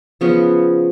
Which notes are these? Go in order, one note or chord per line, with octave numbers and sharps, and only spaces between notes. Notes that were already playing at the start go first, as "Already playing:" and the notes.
C#3 F3 B3